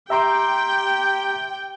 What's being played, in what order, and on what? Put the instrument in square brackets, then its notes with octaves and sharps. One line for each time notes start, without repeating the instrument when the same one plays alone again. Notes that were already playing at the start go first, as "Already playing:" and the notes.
[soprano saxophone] G4 [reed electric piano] E5 A#5 C6 [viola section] G5